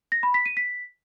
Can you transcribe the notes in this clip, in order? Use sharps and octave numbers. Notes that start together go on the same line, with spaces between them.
A#6
B5
B6
D#7
B6